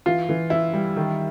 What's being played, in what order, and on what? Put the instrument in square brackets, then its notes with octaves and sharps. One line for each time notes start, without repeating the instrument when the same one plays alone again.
[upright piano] E3 [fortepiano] F4
[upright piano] E3
[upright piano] E3 [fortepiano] E4
[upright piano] G3
D#3